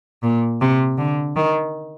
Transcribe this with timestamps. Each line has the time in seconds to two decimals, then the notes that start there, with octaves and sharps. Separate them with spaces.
0.23 A#2
0.61 C3
0.99 D3
1.36 D#3